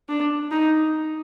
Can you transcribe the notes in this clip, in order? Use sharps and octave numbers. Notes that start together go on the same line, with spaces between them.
D4
D#4